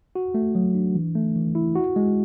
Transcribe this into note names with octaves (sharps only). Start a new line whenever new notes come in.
F#4
A3
F#3
D4
E3
A3
E3
E4
F#4
G#3